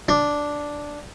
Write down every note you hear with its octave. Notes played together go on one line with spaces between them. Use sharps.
D4